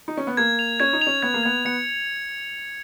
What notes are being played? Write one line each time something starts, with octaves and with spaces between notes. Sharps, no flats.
D#4
C#4
B3
A#3 G#6
F7
C#4 G#6
D#4
F7
C#4
B3 G#6
A#3
B3 G#6
B3 C#7